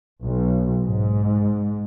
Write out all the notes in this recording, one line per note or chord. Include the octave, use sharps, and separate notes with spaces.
B1
G#2